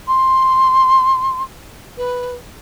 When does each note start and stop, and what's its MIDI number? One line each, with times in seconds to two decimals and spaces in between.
0.08 1.42 84
1.98 2.35 71